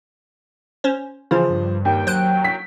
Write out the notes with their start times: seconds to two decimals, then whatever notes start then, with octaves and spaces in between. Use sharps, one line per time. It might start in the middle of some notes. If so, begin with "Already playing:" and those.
0.84 C#4 C5
1.31 C#3 E3 F3 C5
1.50 G2
1.85 D#2 G5
2.07 F#3 C5 F#6 D7
2.44 B6